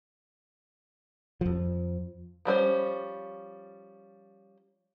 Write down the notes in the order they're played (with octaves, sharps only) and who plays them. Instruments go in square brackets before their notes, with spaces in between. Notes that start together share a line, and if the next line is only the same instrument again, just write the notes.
[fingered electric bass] F2 F3
[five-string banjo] F3 G3 C#4 C5